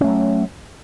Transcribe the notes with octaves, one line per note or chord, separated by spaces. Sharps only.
F#3 A3 C#4